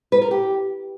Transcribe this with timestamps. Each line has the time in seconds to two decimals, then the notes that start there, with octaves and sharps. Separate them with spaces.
0.12 B4
0.22 A#4
0.31 G4